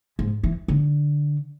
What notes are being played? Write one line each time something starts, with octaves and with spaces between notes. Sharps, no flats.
G#2
E3
D3